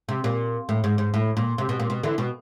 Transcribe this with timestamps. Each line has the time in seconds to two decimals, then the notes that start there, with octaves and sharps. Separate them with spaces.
0.09 C3
0.24 A#2
0.69 A2
0.84 G#2
0.98 G#2
1.14 A2
1.37 A#2
1.58 C3
1.69 B2
1.80 A#2
1.90 B2
2.03 D3 E3
2.18 B2